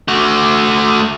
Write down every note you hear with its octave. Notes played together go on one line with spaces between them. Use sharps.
A3 F#4